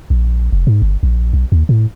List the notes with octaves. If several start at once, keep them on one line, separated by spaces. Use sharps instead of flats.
A#1
F1
G#2
G1
A#1
B1
D#2
A2